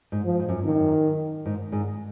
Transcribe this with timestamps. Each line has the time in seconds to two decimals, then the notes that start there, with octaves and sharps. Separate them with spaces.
0.12 G#2
0.25 F3
0.39 G#2
0.49 F#2
0.65 F#2 D#3
1.46 G#2
1.72 G#2